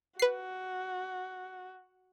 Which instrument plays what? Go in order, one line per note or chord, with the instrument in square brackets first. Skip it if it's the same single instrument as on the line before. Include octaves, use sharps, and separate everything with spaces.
[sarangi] F#4 [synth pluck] B4 C7